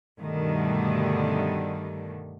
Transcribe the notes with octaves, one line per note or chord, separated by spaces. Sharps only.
G2 B2 D3 D#3 G3 A3